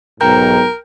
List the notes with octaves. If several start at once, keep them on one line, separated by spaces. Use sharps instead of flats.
B1 G#2 A#4 G5 A#5 G6